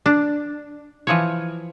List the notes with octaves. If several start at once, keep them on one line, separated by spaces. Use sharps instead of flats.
D4
E3 F3 C#5